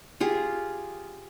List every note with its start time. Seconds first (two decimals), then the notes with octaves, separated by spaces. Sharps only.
0.20 F4 G4 G#4